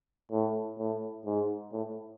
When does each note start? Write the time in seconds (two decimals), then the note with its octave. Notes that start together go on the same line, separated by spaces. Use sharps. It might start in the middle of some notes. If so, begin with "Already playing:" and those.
0.32 A2
0.79 A2
1.26 G#2
1.73 A2